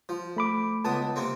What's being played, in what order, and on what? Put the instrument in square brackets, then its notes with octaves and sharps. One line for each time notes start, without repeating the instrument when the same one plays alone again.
[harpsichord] F3
[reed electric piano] A3 B5 D6
[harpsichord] C#2 B3 D#6 [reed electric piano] A5
[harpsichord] C3 A#3 C4